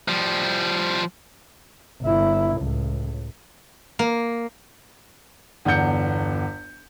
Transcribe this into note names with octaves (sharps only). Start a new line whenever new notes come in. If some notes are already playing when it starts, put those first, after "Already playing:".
F3 G3
G1 E4
C#2 A2
A#3
G1 E2 F#5 G6 C#7